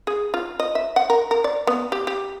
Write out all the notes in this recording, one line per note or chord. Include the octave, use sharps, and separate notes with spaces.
G#4
F4
D#5
E5
F#5
A#4
A#4
D5
B3
G4
G4